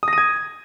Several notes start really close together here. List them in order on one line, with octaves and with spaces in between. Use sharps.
D#6 A#6 D#7 G#6